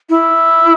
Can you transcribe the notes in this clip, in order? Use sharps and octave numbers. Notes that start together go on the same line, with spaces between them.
E4